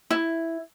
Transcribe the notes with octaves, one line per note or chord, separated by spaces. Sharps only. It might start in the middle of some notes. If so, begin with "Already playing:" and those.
E4